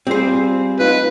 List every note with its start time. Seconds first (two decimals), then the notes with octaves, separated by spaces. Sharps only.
0.07 G3 C4 F4 G#4 C5
0.80 B3 D#4 F4 B4